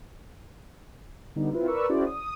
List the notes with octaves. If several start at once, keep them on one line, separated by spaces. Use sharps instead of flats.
D3 G3 B3 D#4
C4 E4 F4 B4
A#4 B4 D5 C#6 E6
C#4 E4 F#4 G#4 C5 D5
D#6